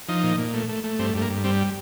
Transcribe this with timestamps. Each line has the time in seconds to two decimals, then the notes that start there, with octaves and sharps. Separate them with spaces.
0.08 F3 D#4
0.23 A#2
0.38 A#2
0.54 A3
0.69 A3
0.84 A3
0.99 G2 C4
1.15 G2 A3
1.22 A#3
1.30 G2
1.44 G3 C4